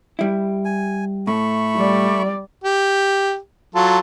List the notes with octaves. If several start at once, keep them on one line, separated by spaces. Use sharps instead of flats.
G3 E4
G#5
A2 A3 B5 C#6
G3 D5
G4
F#3 F4 A4